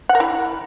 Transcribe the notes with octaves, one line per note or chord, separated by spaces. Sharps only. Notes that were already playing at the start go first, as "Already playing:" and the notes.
F#5
A#4
E4